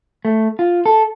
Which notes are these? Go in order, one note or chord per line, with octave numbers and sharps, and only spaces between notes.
A3
F4
A4